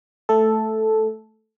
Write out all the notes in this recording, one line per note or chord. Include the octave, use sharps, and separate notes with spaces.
A3 A4